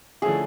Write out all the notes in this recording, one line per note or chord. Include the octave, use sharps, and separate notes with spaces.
D3 F3 A3 C#4 E4 G#4